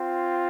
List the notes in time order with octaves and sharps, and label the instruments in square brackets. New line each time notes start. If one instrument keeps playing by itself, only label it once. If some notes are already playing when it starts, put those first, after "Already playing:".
Already playing: [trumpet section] C4 F4